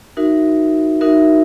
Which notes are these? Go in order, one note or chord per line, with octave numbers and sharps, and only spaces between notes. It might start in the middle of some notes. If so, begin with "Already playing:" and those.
D#4 F#4 A#4 E5
D#4 F#4 A#4 E5